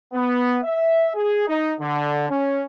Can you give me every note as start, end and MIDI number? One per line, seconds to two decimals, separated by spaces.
0.13 0.59 59
0.63 1.09 76
1.15 1.44 68
1.47 1.71 63
1.80 2.27 50
2.29 2.61 61